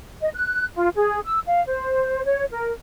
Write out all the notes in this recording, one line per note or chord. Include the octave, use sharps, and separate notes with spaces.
D#5
F#6
F4
G#4
E6
F5
C5
C#5
A#4